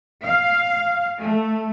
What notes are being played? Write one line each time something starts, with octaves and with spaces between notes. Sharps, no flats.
F5
A3